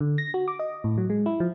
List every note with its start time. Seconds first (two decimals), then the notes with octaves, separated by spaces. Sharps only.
0.01 D3
0.18 A#6
0.34 F#4
0.48 D6
0.59 D#5
0.84 A2
0.98 F#3
1.10 G#3
1.26 E4
1.40 F3